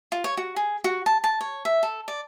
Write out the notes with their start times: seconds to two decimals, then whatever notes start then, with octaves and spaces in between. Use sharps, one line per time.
0.12 F4
0.24 C#5
0.37 F#4
0.56 G#4
0.84 F#4
1.06 A5
1.24 A5
1.41 C#5
1.65 E5
1.83 A4
2.08 D5